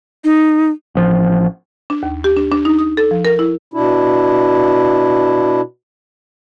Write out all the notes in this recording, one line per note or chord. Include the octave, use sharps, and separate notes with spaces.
D#4
A1 F3
D4
D#2
G4
D4
D4
D#4
D#6
A4
F3
A#4
E4
B2 D4 E4